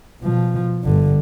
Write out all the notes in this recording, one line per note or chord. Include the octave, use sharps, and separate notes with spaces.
B2 F3
G1 D3